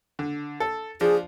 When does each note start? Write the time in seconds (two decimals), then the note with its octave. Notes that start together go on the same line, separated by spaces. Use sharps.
0.19 D3
0.60 A4
1.01 F3 D4 G#4